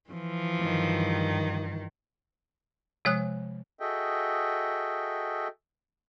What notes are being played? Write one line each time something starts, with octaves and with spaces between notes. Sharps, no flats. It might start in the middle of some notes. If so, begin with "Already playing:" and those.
E3 F3
G2 D#3
C3 F3 G#3 C#5 D#6 F#6
F#4 G#4 A4 D#5 E5 G5